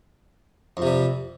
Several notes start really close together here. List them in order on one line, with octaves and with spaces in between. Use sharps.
F2 C3 G3